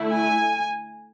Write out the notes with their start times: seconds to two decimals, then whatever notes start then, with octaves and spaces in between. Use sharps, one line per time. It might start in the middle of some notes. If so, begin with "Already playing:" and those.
Already playing: D3 A3 E4
0.11 G#5